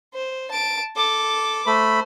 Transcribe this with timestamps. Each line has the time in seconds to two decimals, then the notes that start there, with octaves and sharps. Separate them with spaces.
0.14 C5
0.51 A5 D7
0.96 A4 D6
1.67 A3 C5 B5